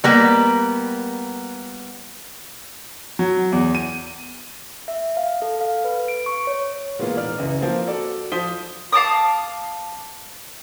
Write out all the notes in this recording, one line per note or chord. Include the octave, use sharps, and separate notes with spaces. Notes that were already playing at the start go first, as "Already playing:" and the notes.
G3 A#3 B3
F#3
E2
D#7
E5
F5
A4
F5
B4
D7
C#6
C#5
A#2 E3 G#3 A#3 B3 F4
E1 D5 F6
C#2 F#2 E3
F3 A#3 C4
F#4 A4 D5
F3 C5 D#6 B6 G7
F5 A5 D6 D#6